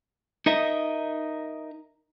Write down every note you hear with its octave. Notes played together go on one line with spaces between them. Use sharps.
D#4 A#4 D#5 E5